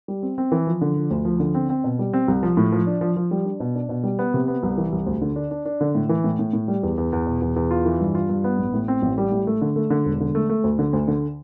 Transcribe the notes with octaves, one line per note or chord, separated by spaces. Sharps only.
G3
C4
C4
E3
F3
D3
F3
D2
F3
D3
C4
C4
B2
G3
C4
C2
F3
A2
F3
D4
F3
F3
G3
D4
B2
D4
B2
G3
B3
C3
B3
C2
E3
C2
D2
D3
D4
D4
D4
D3
A2
E3
A2
A2
A2
G3
E2
E2
E2
B2
E2
E2
F4
E3
G2
F4
G2
B3
A1
A2
C4
A1
G3
A2
A3
D3
A3
D3
E1
D3
A3
A3
D2
D3
D2
D3